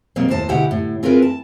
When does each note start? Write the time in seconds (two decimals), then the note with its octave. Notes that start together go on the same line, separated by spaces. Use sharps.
0.16 B2 F#3 G3 A#3 C4
0.29 D#2 A2 C5 A5
0.49 D2 B2 E4 G4 F#5
0.71 A2
1.03 C4 F4 G#4 A#4 B4
1.22 A5